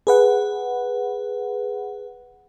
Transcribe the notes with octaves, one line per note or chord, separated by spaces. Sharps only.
G#4 B4 F#5